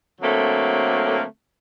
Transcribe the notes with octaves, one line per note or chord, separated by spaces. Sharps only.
D3 F#3 A3 A#3 C4